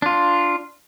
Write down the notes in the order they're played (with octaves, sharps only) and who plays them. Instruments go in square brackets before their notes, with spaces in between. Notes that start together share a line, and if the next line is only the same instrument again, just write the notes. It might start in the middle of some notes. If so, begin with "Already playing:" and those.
[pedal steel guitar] D4 F4